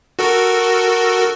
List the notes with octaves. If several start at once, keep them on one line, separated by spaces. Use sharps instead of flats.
F#4 A4 A#4